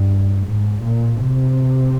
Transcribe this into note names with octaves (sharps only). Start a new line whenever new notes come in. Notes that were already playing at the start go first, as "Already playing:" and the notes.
Already playing: G2
G#2
A#2
C3